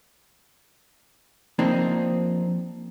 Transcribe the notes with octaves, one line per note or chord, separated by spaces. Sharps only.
F3 A#3 C4 D4 D#4